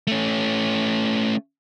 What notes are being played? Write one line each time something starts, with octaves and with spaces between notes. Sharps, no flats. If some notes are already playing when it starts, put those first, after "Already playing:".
A3 C#4